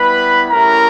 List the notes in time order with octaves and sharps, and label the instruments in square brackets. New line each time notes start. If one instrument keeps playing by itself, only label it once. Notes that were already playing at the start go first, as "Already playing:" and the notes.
Already playing: [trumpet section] G3 B3 E4 B4 B5
A3 C#4 E4 G4 A#4 A#5